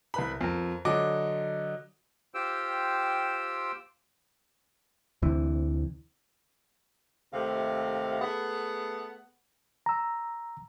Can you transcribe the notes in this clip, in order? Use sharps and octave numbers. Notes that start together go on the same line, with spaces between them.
C2 B4 B5
F2 A#4
D3 F#3 D#5 D6
F4 G4 C5 G5 E6
D2 C3 E3
D#2 C3 A3 F5
A3 B3 G#4 F#5
A#5 E6